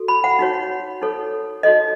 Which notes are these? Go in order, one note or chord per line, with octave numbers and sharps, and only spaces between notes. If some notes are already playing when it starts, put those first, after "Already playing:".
Already playing: F#4 A4
B5
F#5
D#4 F#4 C#5
D#4 A4 C#5
D#4 F#4 A4 C#5 D#5